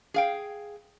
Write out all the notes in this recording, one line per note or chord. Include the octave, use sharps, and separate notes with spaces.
G#4 F5 G5